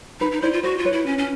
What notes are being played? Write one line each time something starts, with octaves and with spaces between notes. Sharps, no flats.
D#4 B4
D#4
E4 C5 D5
F4
F#4 C5
F4
B4 C#5
E4
C#4
C#4